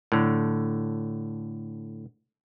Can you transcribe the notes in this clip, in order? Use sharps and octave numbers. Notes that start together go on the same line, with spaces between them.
A2 D3